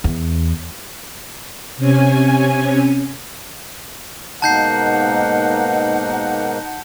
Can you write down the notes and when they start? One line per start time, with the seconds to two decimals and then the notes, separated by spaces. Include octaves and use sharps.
0.04 E2
1.77 C3 C#4 G#5
4.42 G#2 B2 A#3 D#4 F#5 A5 G6 C7